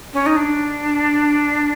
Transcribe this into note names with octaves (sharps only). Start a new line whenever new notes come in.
C#4
D#4
D4